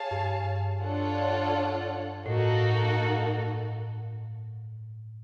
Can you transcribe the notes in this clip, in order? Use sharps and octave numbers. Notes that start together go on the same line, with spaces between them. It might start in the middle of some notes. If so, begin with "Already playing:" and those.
Already playing: G#4 C#5 F5 A5
G2
D4 F4 A4 C#5 F#5
A2 A#3 D#4 F#4 A4